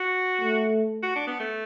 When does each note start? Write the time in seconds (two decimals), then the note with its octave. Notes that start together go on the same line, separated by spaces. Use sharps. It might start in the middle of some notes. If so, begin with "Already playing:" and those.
Already playing: F#4
0.41 A3
1.03 F#4
1.16 D4
1.27 B3
1.39 A3